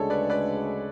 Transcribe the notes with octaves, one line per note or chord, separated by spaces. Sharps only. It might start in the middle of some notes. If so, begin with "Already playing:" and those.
Already playing: D2 C#3 G#3 D4 G#4 A4 C#5
B4 D5
B4 D5